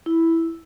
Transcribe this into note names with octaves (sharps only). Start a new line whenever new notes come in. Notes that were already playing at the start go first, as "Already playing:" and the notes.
E4